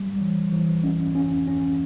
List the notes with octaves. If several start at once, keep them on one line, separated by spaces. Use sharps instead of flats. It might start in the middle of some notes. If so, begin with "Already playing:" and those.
Already playing: G3
E3
E3
C#4
C#4
C#4